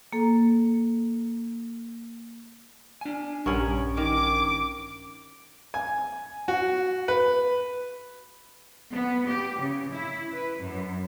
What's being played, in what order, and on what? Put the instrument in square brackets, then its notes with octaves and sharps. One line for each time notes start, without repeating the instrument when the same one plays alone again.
[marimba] A#3 A4
[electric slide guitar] D4 G#5
[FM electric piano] A#1 C#6 G#6 [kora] G2 C#4 [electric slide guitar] A#4 F#5
[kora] D#3 [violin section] D6
[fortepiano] G#5
F#4
B4
[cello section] B3
G4
C#3
E4
B4
F#2